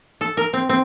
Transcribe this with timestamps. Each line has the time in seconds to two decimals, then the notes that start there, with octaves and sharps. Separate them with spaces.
0.21 A4
0.37 A#4
0.53 C4
0.69 C4